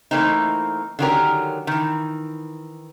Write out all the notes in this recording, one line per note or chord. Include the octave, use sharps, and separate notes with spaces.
E3 A3 A#3 C4 D#4
D3 D#3 F#3 C#4 G4 A#4
D#3 E3